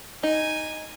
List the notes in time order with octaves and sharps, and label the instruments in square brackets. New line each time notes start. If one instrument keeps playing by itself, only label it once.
[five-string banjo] D#4 [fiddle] G#5